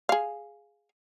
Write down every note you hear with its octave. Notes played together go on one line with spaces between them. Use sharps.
G#4 F5